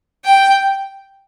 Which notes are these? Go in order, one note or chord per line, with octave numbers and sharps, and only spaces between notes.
G5